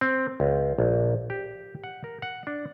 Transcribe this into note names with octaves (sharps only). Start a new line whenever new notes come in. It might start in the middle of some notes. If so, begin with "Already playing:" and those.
C4
C#2
A#1
G4
F#5
A#4
F#5
D4